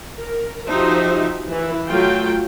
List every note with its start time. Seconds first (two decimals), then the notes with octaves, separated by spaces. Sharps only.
0.19 A#4
0.70 F3 D#4 F#4 G4 C5 E5
1.48 E3 E4
1.87 F#3 A3 F4 G5